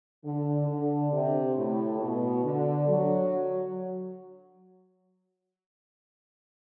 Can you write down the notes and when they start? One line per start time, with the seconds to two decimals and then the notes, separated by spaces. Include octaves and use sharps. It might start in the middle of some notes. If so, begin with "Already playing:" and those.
0.25 D3
0.68 D3
1.13 C3
1.56 A2
2.00 B2
2.44 D3
2.88 F#3